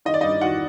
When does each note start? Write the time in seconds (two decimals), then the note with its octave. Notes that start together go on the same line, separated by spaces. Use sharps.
0.05 D#3 D#5
0.14 D5
0.21 G2 D#4 D#5
0.41 D#3 F#4 F#5